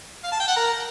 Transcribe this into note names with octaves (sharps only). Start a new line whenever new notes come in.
F5
A5
G5
F#5
A#4